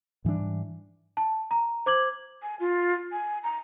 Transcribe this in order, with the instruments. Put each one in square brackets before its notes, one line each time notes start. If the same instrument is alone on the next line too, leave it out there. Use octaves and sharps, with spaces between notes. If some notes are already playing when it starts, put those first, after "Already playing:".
[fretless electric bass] G#2 E3 G3 D4
[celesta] A5
A#5
C5 D6 G#6 F#7
[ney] G#5
F4
G#5
A#5